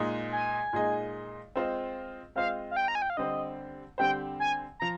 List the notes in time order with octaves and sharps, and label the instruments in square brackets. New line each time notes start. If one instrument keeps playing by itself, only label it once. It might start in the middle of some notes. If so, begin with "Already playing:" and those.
Already playing: [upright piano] A#2 G#3 D#4 G#4 D#5
[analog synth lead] G#5
[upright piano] A#2 G#3 D#4 G#4 D#5
G#3 C4 F4 C5 D#5
[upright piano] G#3 C4 F4 C5 D#5 [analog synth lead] F5
[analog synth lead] F5
G5
A#5
G#5
G5
F5
[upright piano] D3 G3 C4 G4 C5 [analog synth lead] D#5
[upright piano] D3 G3 C4 G4 C5 [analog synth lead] G5
[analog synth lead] G#5
[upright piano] F3 [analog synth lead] A#5